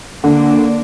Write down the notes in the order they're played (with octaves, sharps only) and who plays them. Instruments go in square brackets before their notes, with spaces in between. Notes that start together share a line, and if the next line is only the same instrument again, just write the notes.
[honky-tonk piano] D3 [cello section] A#3 D4